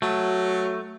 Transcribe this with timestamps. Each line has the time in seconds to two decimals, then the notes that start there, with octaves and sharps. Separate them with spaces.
0.02 F#3 A3